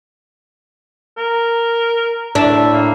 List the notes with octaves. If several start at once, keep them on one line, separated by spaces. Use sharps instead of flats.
A#4
A2 D4 E5
A#3